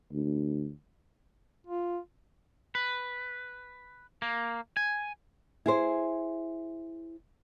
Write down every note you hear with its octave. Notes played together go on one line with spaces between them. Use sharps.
D2
F4
B4
A#3
G#5
E4 G#4 C5